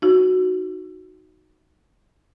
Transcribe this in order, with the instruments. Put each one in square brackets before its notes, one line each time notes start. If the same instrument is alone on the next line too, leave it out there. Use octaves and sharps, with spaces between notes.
[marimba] D#4 F#4